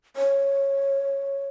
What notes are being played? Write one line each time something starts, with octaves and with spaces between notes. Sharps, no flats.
C#5